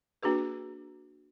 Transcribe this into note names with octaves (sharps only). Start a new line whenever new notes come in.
A#3 D4 F#4 G#4 B4